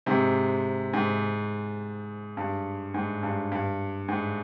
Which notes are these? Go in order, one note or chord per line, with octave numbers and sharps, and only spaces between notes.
G#2 C3
G#2
G2
G#2
G2
G2
G#2